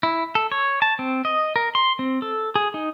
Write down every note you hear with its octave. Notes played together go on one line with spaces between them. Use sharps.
E4
A4
C#5
A5
C4
D#5
A#4
C6
C4
A4
G#4
D#4